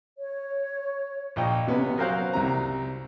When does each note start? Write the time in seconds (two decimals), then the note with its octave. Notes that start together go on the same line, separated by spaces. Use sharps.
0.18 C#5
1.36 A#1 D#5 G5
1.67 C3 B3 C#4
1.97 F#3 A#4 C5 F5 F#6
2.33 C2 C3 A#5